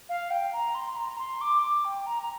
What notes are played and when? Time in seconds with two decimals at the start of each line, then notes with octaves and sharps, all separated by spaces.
0.09 F5
0.31 G5
0.53 A#5
0.75 C6
0.97 A#5
1.18 C6
1.41 D6
1.62 D6
1.84 G5
2.06 A#5
2.23 A#5